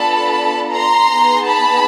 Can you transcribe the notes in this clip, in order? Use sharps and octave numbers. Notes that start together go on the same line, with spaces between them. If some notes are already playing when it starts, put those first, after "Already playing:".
Already playing: B3 D4 F4 A4 A5 B5
A#5 C6
B3 D#4 G#4
A5 B5